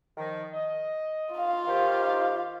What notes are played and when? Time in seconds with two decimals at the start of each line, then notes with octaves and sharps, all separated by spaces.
0.17 D#3 F3
0.54 D#5
1.34 F4 F5
1.67 D#3 G4 C5